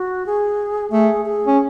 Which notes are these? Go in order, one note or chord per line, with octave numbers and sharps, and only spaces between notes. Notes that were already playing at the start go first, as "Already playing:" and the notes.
Already playing: F#4
G#4
A3 G#4
G#4
C#4